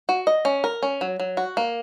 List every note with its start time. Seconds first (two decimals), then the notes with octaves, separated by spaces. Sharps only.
0.09 F#4
0.27 D#5
0.45 C#4
0.64 A#4
0.83 C#4
1.01 F#3
1.20 F#3
1.37 F#4
1.57 A#3